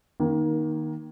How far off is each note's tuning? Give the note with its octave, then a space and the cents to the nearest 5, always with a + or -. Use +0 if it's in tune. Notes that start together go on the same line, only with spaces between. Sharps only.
D#3 +0 A#3 +20